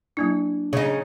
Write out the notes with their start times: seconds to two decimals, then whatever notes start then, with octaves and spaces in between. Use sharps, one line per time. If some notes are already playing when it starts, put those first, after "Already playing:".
0.17 F#3 A#3 D4 E4
0.73 C#3 D#4